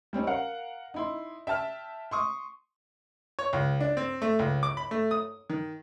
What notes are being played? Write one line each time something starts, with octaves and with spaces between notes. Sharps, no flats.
G3 C4 C#4 D#4
A#4 F5 F#5
D#4 E4 C6
E5 G5 A5 F6
C6 C#6 D#6
C#5
C#2
D4
C4
A3
C#2
D6
B5
A3
D#6
D#3